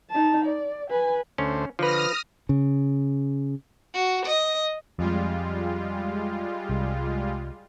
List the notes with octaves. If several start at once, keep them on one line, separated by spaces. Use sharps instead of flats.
D#4 A5
D5
B4 G#5
D2 A3 C#4 C5
D3 F3 B4 D#6 F6 A#6
C#3
F#4
D#5
F2 G3 G#3 F4
C2